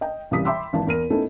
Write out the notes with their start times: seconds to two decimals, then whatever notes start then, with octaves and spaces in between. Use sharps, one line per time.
0.01 D#5 G5
0.31 C2 C#3 E3 G3 D#6 B6
0.45 E5 G5 B5 C6 D6 E6
0.73 G#1 E3 A5
0.87 E2 A#4 D#7
1.10 A3 B3 C#4 D#4 E4 A4